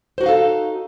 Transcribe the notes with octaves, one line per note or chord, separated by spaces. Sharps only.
D#4 F#4 A4 C5 F5